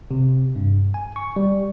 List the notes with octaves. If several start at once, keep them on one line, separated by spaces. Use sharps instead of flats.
C3
G2
G#5
C#6
G3